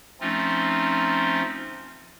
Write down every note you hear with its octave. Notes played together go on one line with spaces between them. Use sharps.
F3 A3 C4 C#4 D#4 F4